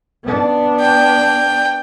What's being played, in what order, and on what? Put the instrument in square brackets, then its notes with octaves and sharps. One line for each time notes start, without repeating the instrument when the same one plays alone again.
[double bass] B3 D4
[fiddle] G5